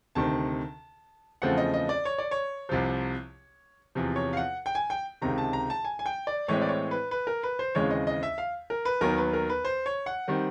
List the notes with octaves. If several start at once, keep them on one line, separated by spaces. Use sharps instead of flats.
D2 C3 D#3 A5
E2 C#3 F3 A3 C4 F#5
D#5
D#5
D5
C#5
D5
C#5
C2 C3 F3
E2 C3 F3
C#5
F5
F#5
G5
G#5
G5
C#2 C3 D#3 A#5
A5
A#5
A5
G#5
G#5
G5
D5
A2 E3 G#3 C4 C#5
D5
C#5
B4
B4
A#4
B4
C5
D#2 C#3 E3 G#3 C4 C#5
D#5
D#5
E5
F5
A#4
B4
D#2 D#3 F#3 B3 A#4
B4
A#4
B4
C5
C#5
F#5
D#3 G3 C4